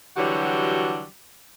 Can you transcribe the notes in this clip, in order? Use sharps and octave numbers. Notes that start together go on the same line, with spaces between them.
D3 E3 F#3 G3 F#4 G4